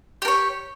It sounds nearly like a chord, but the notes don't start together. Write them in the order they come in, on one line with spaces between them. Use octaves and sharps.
G4 A#4 C#5